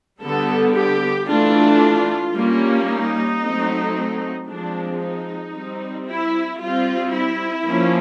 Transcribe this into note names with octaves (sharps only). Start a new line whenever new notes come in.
D3 G3 B3 A4
G4
E3 A3 D4 F4
G3 A#3 C#4
D#4
F#3 A3 C4
F3 G#3 C4 D4
D#4
G3 C4
E4
G3 C4 F4
E4
F3 A#3 C#4